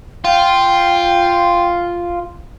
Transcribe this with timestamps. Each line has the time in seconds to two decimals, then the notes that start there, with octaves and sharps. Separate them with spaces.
0.25 F4 G5